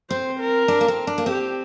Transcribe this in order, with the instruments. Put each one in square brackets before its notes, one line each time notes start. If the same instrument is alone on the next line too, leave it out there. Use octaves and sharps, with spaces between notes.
[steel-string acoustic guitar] C4 [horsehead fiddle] C5
[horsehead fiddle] A#4
[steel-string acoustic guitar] D4
A#3
C4
D4
A#3
[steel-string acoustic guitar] C4 [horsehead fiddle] G4